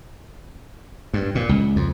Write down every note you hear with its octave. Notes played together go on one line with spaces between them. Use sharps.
G2
A#2
C#2
F2